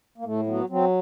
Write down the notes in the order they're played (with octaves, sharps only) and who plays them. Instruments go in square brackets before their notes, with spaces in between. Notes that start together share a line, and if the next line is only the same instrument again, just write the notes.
[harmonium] A#3
A2 A3
F#3 B3
F#3 C4